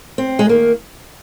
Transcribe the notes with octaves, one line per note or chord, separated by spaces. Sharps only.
C4
G#3
D#3 A#3